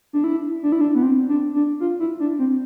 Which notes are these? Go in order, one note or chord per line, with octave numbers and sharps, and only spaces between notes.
D4
E4
D4
E4
D4
B3
C4
D4
D4
F4
E4
D4
C4